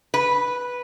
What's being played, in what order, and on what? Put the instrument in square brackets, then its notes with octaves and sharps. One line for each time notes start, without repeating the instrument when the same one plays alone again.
[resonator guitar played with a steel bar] B4